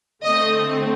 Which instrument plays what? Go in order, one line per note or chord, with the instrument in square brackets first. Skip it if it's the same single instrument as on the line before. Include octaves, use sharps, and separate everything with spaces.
[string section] D3 A3 C4 D#5